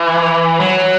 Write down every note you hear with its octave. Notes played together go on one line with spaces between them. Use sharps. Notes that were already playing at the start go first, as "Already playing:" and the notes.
Already playing: E3
F#3